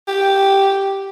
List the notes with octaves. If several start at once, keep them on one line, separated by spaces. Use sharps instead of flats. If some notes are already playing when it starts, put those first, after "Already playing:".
G4